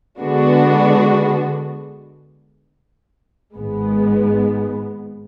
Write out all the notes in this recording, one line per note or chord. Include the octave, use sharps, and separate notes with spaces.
D3 G#3 B3 D4 F#4
G#1 G#2 G#3 B3